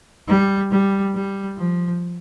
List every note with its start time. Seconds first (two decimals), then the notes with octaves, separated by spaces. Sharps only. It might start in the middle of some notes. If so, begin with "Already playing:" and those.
0.28 G3
0.71 G3
1.14 G3
1.58 F3